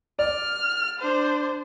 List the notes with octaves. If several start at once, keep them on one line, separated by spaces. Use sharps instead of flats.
D5 F6
D4 C5